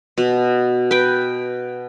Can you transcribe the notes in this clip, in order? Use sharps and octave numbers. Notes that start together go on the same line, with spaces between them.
B2
B4 G5